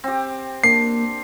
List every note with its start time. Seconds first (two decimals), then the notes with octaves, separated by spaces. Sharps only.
0.04 C4 G4
0.64 A#3 D4 C7